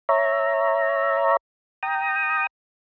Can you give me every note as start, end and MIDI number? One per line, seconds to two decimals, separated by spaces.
0.09 1.37 73
0.09 1.37 76
0.09 1.37 82
1.83 2.47 79
1.83 2.47 82
1.83 2.47 87